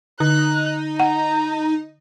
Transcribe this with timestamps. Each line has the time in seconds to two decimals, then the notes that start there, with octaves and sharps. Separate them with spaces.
0.20 D3 D#4 F#6
1.00 F#5 A#5